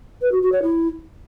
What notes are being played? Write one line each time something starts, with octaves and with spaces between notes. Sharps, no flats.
B4
F#4
F#4
C#5
E4